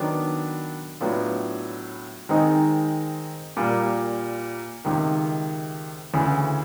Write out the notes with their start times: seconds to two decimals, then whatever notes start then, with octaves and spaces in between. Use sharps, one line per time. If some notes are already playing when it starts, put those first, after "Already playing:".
Already playing: D#3 F#3 B3 D4
1.00 A2 F#3 B3 D4 F4
2.29 D#3 G#3 C4 D#4
3.57 A#2 G3 A#3
4.85 C#2 C3 D#3
6.13 D2 C#3 E3